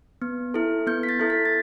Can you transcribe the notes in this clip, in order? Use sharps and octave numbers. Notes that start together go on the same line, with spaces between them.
B3
E4 A4
B3 G6
B6
A6
E4 A4
B6
A6